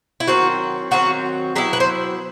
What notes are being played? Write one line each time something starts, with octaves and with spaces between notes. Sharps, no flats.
E4
D#3 F#3 C4 F#4
D#3 F#3 C4 F#4
F#3 B3 E4 G4
B4
C5